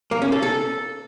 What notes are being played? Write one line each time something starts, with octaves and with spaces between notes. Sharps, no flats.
A#3
C#4
A4
A4